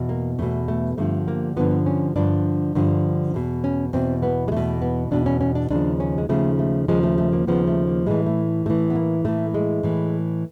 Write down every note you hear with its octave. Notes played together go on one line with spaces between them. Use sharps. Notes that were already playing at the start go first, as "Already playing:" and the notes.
Already playing: E2 B2
A#3
E2 B2 A3
A3
G2 D3 F3 A3
A#3
G2 D3 F3 B3
C#4
G2 D3 F3 D4
G2 D3 F3
E2 B2
C#4
E2 B2 C4
B3
G#3
E2 B2 A3
B3
E2 B2 D4
C#4
C#4
D4
D#2 C#3 F3 D4
C#4
G#3
D#2 C#3 F3 A3
A3
D#2 C#3 F3 G#3
A3
A3
A#3
D#2 C#3 F3 B3
A3
A#3
A2 E3 G#3
A3
A2 E3 A3
B3
A#3
A2 E3 A3
G#3
A2 E3